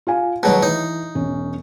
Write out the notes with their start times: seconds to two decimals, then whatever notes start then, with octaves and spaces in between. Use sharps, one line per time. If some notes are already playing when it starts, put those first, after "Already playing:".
0.07 F4 F5 G#5
0.43 B2 D#3 F#3 G3 G#4
0.63 E3 D#4
1.15 E1 C#4